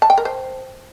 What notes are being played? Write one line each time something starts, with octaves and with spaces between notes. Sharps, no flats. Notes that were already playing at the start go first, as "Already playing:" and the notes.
A5
G5
A#4
C5